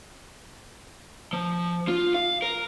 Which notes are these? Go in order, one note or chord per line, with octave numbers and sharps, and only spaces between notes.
F3
F4
F5
A#4